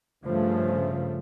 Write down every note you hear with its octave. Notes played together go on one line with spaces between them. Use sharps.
G2 C#3 F3 A3